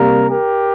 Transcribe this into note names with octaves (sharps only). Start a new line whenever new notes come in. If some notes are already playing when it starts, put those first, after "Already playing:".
Already playing: C3 G3 A#3 A#4
G4 A#4